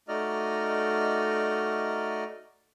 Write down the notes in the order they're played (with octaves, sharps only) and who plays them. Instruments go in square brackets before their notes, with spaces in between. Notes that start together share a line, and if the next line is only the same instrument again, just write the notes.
[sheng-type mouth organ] A3 D#4 F#4 D5 D#5 F6